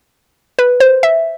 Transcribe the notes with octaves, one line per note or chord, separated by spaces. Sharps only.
B4
C5
E5